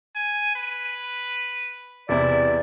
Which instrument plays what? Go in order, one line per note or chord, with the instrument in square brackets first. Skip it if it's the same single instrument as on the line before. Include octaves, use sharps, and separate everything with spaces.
[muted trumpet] G#5
B4
[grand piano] E2 C3 [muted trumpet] E4 [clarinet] D5